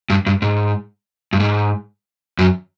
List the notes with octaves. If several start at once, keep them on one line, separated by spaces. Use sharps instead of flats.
G2
G2
G#2
G2
G#2
F#2